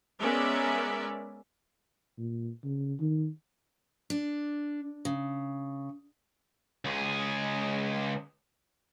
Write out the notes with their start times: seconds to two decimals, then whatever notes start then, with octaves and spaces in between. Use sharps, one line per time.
0.20 G#3 B3 C#4 A#4 D5 E5
2.18 A#2
2.64 C#3
3.00 D#3
4.10 D4
5.05 C#3
6.85 C#2 G#4